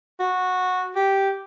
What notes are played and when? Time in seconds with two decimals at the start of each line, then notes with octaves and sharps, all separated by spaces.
0.20 F#4
0.96 G4